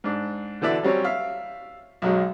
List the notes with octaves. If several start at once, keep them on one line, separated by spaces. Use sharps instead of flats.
G#2 D4
B2 D3 E3 D5 E5
F#3 G3 C4 C#4 C#5
E5 F5
B1 F#2 F#3 G#3